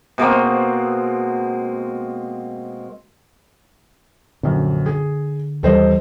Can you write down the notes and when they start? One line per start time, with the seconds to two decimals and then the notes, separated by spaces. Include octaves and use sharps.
0.18 B2 G#3 A#3 C4
4.43 A#1 F#2 D3
4.86 G#4
5.63 D#2 E3 G3 A4 C5 D#5